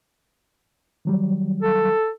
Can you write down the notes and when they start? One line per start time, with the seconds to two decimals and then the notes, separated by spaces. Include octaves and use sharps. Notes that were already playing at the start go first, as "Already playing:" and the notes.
1.05 D#3 F#3 G3
1.62 A4